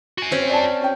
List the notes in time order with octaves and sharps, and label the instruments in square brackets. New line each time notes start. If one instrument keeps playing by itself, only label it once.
[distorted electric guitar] F#4 G#5
[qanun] C4 C#4
[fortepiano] D5 A5
C#4 G5